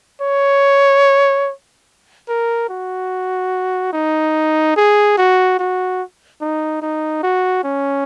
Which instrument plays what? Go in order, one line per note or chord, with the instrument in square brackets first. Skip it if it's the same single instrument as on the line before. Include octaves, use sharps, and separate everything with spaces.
[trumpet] C#5
A#4
F#4
D#4
G#4
F#4
F#4
D#4
D#4
F#4
C#4